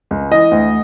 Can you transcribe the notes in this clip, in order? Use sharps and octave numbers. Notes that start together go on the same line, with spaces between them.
C#2
E3 D#5
D2